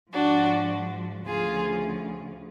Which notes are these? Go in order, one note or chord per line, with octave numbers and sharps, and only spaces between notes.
G#2 F3 D4 F#4
D2 C#3 F3 F4 G#4